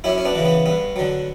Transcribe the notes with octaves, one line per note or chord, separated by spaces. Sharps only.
F#2 C#4 E4
C#4
B3 D4
C#3 E3
B3
G2 B3
D3 F#3